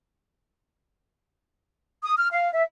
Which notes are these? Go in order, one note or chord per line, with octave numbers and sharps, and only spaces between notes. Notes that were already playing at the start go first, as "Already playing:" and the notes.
D#6
F6
F5
E5